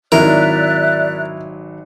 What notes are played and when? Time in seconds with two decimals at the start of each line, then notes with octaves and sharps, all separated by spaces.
0.12 G#1 F#3 D#4 E4 A#4 D5 E5 F#6